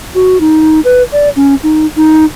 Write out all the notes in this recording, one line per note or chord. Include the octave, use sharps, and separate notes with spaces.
F#4
D#4
B4
D5
C#4
D#4
D#4